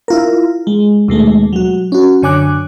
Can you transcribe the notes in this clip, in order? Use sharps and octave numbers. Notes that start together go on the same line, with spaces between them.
E4 F4 A#4
G#3
D#2 B2 G#3 A3
F#3 F#4
C#4 F#4
F#2 D3 C#5 G#5 D6 F#6